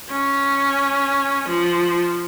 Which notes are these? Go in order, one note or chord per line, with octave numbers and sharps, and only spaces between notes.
C#4
F3